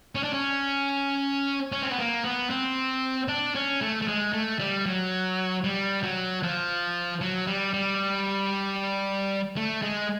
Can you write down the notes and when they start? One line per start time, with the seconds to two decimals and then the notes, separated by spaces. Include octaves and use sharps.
0.15 C#4
0.24 D4
0.33 C#4
1.72 C#4
1.83 C4
1.91 B3
1.99 A#3
2.24 B3
2.50 C4
3.28 D4
3.55 C#4
3.81 A3
4.02 A3
4.08 G#3
4.33 A3
4.59 G3
4.86 F#3
5.64 G3
6.03 F#3
6.43 F3
7.21 F#3
7.47 G3
7.73 G3
9.56 A3
9.82 G#3